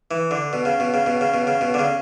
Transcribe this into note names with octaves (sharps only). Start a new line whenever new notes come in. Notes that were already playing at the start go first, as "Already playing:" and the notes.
E3
D3
B2
C#3
B2
C#3
B2
C#3
B2
C#3
B2
D3
C#3